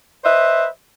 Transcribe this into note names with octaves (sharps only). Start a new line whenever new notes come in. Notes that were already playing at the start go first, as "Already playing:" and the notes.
B4 C5 D#5 E5